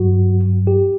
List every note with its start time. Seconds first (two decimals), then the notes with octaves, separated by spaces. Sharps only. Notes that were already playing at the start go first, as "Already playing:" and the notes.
Already playing: G2 F#3 F#4
0.67 G4